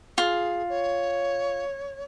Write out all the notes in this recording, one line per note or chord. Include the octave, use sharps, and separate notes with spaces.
F4 G#4
C#5